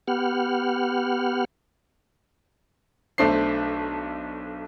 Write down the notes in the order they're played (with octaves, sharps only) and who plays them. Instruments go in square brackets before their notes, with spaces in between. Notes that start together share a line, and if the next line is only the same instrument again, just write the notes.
[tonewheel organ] B3 G4 F#5 F6
[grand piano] B1 A3 D4 C5 C7